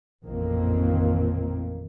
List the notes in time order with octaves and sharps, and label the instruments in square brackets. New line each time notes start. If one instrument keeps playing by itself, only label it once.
[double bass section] A1 F2 A#2 D#3 A#3 C4